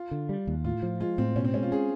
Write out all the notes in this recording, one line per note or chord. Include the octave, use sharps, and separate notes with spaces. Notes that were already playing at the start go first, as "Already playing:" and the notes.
Already playing: F4
D3
G3
D#2
A2 F4
F3
G#3 F4
A2 C4
B2 C#4
C4
G#3 C#4
F4
C#4 G#4